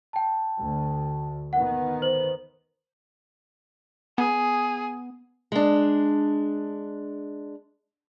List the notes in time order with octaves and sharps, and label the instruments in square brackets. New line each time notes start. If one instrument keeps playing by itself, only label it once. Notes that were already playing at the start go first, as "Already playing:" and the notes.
[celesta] G5 A5
[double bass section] D2
[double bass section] D#3 B3 [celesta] F#5
[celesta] C5 F#7
[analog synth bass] B3 [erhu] G#4
[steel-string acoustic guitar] G#3 D4